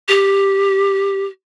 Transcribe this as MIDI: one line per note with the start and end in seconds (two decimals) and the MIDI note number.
0.08 1.25 67